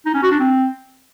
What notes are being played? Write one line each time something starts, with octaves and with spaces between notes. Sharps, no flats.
D#4
C#4
F#4
D4
C4